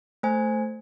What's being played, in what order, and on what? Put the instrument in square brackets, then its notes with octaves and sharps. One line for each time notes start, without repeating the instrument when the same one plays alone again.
[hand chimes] A3 C5 G#5